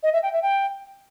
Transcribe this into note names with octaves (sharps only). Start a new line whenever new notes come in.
D#5
E5
G5
E5
G5